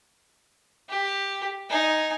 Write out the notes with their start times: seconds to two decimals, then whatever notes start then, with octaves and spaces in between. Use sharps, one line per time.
0.89 G4
1.70 D#4 G#5